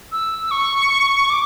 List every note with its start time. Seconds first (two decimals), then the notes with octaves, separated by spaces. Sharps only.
0.12 E6
0.51 C#6
1.30 D6